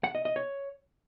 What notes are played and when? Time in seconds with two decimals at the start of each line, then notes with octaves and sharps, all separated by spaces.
0.04 F#5
0.15 D#5
0.25 D#5
0.36 C#5